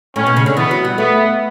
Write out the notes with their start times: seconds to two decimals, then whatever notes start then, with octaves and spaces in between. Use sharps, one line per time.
0.16 A2 C#4
0.26 B2
0.37 C#3
0.46 D3
0.57 E3 B3
0.71 F#3
0.85 G3
0.97 A3 B3